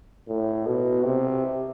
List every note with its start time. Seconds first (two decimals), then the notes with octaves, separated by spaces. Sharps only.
0.28 A2
0.66 B2
1.04 C3